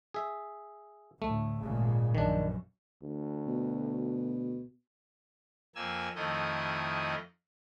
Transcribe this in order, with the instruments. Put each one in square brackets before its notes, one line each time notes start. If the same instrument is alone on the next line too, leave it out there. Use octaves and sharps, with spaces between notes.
[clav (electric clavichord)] G#4 E5
[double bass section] D2 A2 [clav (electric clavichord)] A3
[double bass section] G#1 A#2 C#3
[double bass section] A#1 F#2 [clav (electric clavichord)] D#3 D4
[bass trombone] D2
[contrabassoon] B2
[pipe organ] F2 A#3 G#5 E6
F2 D#3 A3 E4 D#5